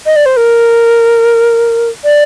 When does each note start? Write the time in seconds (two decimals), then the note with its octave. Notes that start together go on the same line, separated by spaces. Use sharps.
0.06 D#5
0.16 D5
0.26 C5
0.37 A#4
2.05 D5